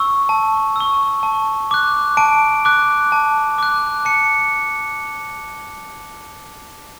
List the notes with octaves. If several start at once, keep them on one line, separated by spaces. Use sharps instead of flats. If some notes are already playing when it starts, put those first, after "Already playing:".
Already playing: C#6 E6
A5
C#6 E6
A5
D6 F#6
A5 D7
D6 F#6
A5
D6 F#6
A5 C#7